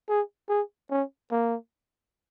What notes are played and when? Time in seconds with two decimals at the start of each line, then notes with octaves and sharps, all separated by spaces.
0.09 G#4
0.49 G#4
0.91 C#4
1.31 A#3